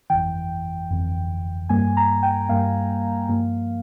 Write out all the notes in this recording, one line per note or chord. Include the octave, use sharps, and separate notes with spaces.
G1 F2 E3 G5
G1 F2 E3
G2 G3 A#3 G#5
A#5
G5
G2 G3 A#3 F5
G2 F3 A#3